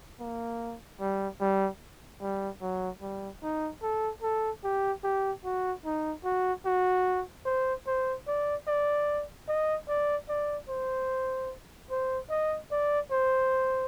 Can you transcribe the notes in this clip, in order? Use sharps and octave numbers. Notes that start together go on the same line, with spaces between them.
A#3
G3
G3
G3
F#3
G3
D#4
A4
A4
G4
G4
F#4
D#4
F#4
F#4
C5
C5
D5
D5
D#5
D5
D5
C5
C5
D#5
D5
C5